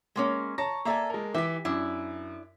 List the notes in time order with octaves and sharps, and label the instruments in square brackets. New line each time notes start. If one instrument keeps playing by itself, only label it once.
[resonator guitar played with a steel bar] G#3 A#3 C#4
[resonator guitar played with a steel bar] C#5 [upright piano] A5 A#5 A#6
[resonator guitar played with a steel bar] A#3 A4 G#5 [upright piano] D5 E5 A#5
[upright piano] G#3 A#4
[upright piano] E3 B6 [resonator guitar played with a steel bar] G4 E5
[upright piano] F#2 [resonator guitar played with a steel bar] D4 E4